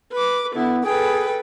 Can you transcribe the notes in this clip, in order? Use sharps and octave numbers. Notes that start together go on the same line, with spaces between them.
B4 D6
D3 B3 E4
G#4 A4 B4 G5